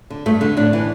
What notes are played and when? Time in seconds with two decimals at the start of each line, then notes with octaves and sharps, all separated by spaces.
0.10 D3
0.26 G2 A3
0.41 D3 A3
0.57 A2 D4
0.73 E3